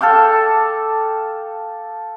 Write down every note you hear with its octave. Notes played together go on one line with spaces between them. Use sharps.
A4 F5 G5 D6